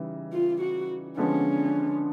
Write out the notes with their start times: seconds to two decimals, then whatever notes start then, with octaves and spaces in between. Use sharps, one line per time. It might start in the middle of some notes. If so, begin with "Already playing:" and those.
Already playing: C#3 E3 G3 D#4
0.32 F4
0.61 F#4
1.17 D3 F3 G#3 B3 C#4 D4